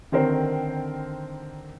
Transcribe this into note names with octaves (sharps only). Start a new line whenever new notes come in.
D3 D#3 C4 A#4 C5